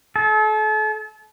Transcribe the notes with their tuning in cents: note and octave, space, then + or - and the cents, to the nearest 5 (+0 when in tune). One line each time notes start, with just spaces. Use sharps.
A4 -40